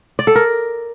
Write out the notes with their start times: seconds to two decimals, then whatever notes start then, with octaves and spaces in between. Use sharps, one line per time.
0.19 D5
0.27 A4
0.35 A#4